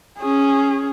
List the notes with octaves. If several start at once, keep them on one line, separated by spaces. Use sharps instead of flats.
C#4 G#4